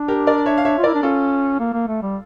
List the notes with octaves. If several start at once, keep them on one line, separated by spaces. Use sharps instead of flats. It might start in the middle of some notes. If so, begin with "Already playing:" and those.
Already playing: D4
G4 A#4
A#4 D5
C#5 E5
F5
C#5 E5
F4
E4 A#4 D5
D4
C#4 F4 A4
A#3
A#3
A3
G3